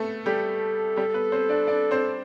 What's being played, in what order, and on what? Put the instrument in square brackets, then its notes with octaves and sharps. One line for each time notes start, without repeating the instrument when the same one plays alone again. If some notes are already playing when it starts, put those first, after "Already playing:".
Already playing: [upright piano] A3 B3 A4
[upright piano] G3 G4 [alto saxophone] A4
[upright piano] G3 G4
B3 B4
C4 C5
D4 D5
D4 D5
C4 C5